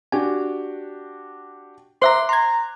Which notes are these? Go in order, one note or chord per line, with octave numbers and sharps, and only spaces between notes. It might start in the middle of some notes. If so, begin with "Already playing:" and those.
D4 F#4 G4 G#5
C5 E5 A#5 C6 D6 F#6
A#5 C6 G#6